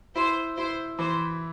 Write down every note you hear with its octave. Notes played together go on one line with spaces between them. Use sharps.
E4 C5
E4 C5
E3 C5